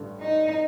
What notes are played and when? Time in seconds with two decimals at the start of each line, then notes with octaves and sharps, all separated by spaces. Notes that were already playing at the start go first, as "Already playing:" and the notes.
Already playing: A1 G2 D3
0.21 D#4